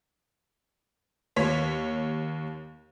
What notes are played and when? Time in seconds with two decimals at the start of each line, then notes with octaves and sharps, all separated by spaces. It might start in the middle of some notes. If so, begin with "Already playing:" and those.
1.36 D#2 C#5 B6